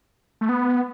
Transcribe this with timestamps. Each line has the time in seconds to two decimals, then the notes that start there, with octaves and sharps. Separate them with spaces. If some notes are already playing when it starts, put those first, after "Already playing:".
0.41 A3
0.49 B3